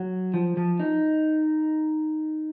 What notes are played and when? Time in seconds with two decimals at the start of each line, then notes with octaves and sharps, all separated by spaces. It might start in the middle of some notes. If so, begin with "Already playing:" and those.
Already playing: F#3
0.34 F3
0.57 F3
0.80 D#4